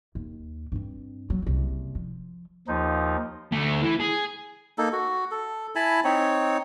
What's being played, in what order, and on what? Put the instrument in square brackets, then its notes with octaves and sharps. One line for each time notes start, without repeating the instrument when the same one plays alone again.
[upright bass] D#2
G2 C4
F#3
F#1 C2
F3
[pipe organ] D#2 F3 D#4
[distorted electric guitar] D2 A3
E3
G#4
[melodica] A#3 D#4 A4
F#4
A4
E4 G#5 A5 B5
C4 D#4 C#5